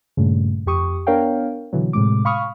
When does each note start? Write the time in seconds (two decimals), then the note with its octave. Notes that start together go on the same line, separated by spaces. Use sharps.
0.17 G2 A#2 C#3 A3
0.66 F2 G4 C#6 D#6
1.07 B3 D4 A#4 C#5 F5 G5
1.73 B2 D3 E3 F#3
1.93 A2 C3 G#3 D6
2.25 F5 B5 C#6 D#6 F6